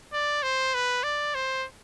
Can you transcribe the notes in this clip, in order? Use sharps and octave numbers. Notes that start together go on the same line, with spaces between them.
D5
C5
B4
D5
C5